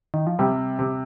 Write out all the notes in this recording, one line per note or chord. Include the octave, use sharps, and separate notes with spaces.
D#3
F3
C3 G3
C3